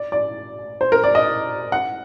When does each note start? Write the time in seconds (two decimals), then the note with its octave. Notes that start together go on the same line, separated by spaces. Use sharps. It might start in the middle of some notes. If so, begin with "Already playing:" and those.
Already playing: D5
0.12 D5
0.81 C5
0.92 A#4
1.04 D5
1.15 D#5
1.72 F#5